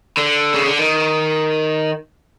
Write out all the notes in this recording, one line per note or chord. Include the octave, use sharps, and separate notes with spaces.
D3
C#3
D3
D#3